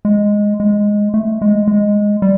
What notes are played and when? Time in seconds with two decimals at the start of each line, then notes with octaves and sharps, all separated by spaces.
0.05 G#3
0.60 G#3
1.14 A3
1.42 G#3
1.68 G#3
2.22 G3